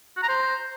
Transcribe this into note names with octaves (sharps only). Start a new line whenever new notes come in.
F#4
A#5
C5